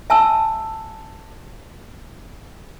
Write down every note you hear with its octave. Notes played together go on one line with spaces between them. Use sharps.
E5 G#5 A5 E6